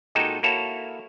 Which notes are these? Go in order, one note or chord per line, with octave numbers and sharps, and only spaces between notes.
A#2 G#3 D#4 F#4 A4 G5
A#3 E4 F#4 A4 C#5 A5